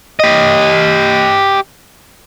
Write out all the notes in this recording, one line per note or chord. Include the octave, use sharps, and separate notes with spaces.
G4 D#5